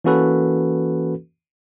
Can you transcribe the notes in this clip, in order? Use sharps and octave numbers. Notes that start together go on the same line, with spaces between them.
E3 A#3 C#4 F#4 A4 B4